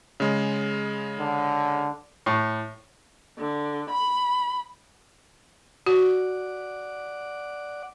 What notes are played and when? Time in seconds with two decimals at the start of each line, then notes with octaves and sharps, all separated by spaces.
0.20 C#3 G#3
1.20 D3
2.26 A2
3.38 D3
3.90 B5
5.86 F#4 D5 F#5 D6